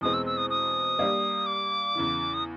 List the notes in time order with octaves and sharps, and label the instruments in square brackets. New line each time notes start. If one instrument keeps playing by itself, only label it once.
[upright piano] E2 B2 G#3 C4 [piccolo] D#6
[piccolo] E6
E6
D#6
D#6
[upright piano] G3 A#3 D4 G4
[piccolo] D6
[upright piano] E2 C#3 E3
[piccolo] D#6